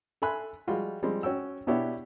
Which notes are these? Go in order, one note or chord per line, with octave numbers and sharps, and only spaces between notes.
A4 E5 G#5 B5 C6 F#6
F3 G3 G#3 F4 F#4
F3 G3 G#3 C4
C#4 F#4 G5 E6
B2 B3 D4 E4 G4 C#5